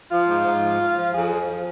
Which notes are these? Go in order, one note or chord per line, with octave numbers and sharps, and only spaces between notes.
F3 F4
G#2
G#2
F3
F3
F3
F2 G#4
F3
F3